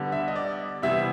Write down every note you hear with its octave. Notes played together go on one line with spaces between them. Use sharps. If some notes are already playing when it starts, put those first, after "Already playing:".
Already playing: D3 G3 B3
E5
D#5
D5
C3 E3 G3 B3 E5